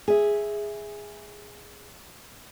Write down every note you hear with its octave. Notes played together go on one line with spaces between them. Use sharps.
G#4 E5